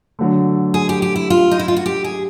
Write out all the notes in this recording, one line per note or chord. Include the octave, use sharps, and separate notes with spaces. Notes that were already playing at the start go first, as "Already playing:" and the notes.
D3 F#3 A3
G#4
G4
G4
E4
F4
D#4
E4
F4
F#4
G4
G#4